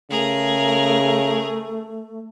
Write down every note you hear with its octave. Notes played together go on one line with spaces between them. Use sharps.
C#3 A3 G#4 A#4